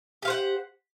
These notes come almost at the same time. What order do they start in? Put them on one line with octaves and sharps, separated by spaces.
G4 F5 C5 F#5